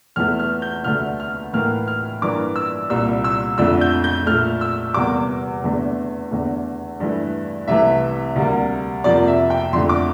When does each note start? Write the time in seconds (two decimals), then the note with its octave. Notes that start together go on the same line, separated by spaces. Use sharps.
0.16 E2 E3 A3 F6
0.39 F6
0.62 G6
0.84 D2 D3 A3 F6
1.20 F6
1.53 A2 E3 A#3 F6
1.88 F6
2.22 G2 E3 A#3 D6
2.56 E6
2.90 C2 A#2 G3 E6
3.24 E6
3.58 F2 D3 A3 E6
3.81 G6
4.04 G6
4.26 A#2 A3 F6
4.61 E6
4.94 E2 C3 G3 A#3 D6
5.64 E2 D3 A3
6.31 E2 D3 A3
7.00 G2 E3 A3
7.67 C2 C3 E3 A3 E5
8.36 D2 C3 G3 A#3
9.04 F2 C3 F3 A#3 D5
9.27 E5
9.50 G5
9.73 F2 C6
9.76 D3 A3
9.89 D6